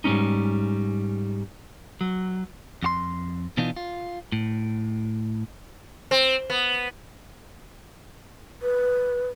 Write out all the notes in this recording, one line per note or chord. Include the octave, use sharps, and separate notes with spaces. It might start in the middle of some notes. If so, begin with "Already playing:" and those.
G#2 G3 G#3 C#4 D#4
F#3
F2 F#4 C6
B2 E3 B3 D4 D#4 F4
F4
A2
C4
B3
B4